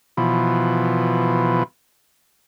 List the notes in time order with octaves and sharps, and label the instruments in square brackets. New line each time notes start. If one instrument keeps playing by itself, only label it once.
[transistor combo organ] B2 E3 F3